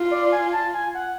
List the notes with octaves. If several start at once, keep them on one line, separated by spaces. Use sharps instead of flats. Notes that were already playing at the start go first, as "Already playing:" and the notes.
Already playing: F4
D5
G#5
A5
G#5
F#5